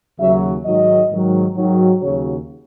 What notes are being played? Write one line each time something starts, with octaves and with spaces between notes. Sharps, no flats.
D#2 C#3 F#3 E5
G#2 D#3 F#3 D#5
G#2 D#3 F#3
G#2 D#3 F#3
D#2 C#3 F#3 C#5